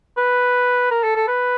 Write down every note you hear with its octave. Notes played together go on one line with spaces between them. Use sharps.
B4
A#4
A4
A4
B4